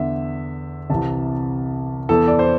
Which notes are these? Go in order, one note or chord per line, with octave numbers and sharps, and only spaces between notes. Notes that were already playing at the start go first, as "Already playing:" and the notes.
Already playing: E2 D3 E5
C2 C3 E3 A5
E2 E3 A4
D5
C5